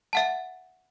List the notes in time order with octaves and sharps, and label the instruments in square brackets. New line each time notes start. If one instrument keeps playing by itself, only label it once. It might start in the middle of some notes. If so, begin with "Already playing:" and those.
[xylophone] E5 F#5 A5